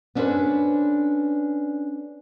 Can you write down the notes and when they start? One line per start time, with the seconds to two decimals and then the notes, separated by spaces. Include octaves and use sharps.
0.15 B3 C#4 D4 A4 B4 C5